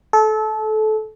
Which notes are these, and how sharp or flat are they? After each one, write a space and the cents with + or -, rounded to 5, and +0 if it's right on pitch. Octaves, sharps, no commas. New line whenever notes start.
A4 -25